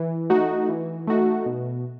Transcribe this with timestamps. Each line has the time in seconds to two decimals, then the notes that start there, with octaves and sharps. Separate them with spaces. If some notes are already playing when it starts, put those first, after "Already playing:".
Already playing: E3
0.30 A3 D#4 F#4
0.69 E3
1.07 A3 D#4 F#4
1.46 B2